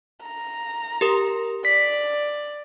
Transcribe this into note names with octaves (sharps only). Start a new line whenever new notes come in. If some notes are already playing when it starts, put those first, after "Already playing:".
A#5
G4 A#4
D5 B6